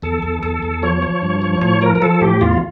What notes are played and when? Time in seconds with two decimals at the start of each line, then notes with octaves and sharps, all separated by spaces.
0.02 E2 A4
0.22 E2
0.43 E2 A4
0.63 E2
0.83 F3 C#5
1.02 F3
1.22 G2
1.42 F3
1.62 A2 C#5
1.81 F3 A#4
1.95 A#4
2.02 F3 A4
2.21 A2 G4
2.41 E2 F4